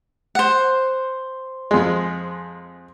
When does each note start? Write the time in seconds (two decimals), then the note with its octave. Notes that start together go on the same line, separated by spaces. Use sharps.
0.35 C5 F#5
1.71 F2 G#3